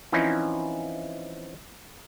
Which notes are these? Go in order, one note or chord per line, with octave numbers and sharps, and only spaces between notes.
E3 F3 C4 C#4 D#4 E4